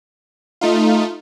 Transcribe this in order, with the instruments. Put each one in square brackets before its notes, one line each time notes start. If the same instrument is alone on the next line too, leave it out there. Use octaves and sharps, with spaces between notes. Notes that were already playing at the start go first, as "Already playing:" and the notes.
[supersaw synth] A3 D#4 F4